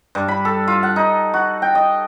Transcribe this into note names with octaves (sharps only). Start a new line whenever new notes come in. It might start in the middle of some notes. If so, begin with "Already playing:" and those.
G2
B5
A4
F4
F#5
D#4
F#4
G5
D#5